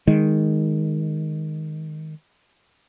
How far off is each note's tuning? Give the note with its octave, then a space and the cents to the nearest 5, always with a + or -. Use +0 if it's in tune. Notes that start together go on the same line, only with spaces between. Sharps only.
D#3 +5 G#3 +0